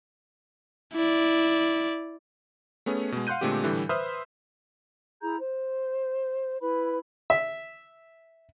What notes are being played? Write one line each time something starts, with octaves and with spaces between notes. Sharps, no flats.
E4 D5
A3 B3 C#4 G#4
B2 G#3
F5 F#5 C6 F#6 G6 D#7
A#2 D3 G#3 A3 C4 G4
A2 D3 E3 G3
B4 C5 E5 C6 D#6 F6
E4 G#4 A#5 G6
C5
E4 B4 B5
E5